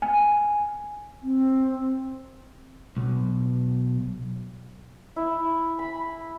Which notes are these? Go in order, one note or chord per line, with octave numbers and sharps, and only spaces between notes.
G#5
C4
B1
E4
B5